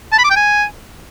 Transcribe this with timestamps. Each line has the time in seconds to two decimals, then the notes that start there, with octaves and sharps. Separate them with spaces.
0.12 A5
0.18 B5
0.24 D6
0.30 G5
0.36 G#5